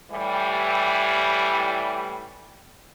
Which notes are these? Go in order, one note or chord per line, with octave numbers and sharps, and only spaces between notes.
A2 E3 G3